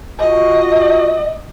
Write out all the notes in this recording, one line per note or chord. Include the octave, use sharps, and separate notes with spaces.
F4 F#4 D#5